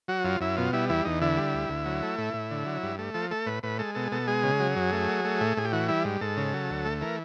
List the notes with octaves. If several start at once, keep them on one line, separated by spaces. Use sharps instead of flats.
F#3 F#4
F#2 F4
F#2 E4
B2 F4
G3 E4
E2 E4
E2 D#4
D3 E4
G3
D2
D2
F#3
A3
A2
A2
D3
F#3
G2
A3
F3 A4
A3 A4
A2 B4
A2 B4
G#3 A4
B2 A4
B2 A4
G#3 G#4
C#3
F#3
F#2
A3
F#3
A3
A2
A2 G#4
G4
E3 F#4
G3 E4
G#2
G#2 A4
C#3
F#3
D2
A3
E3 A#4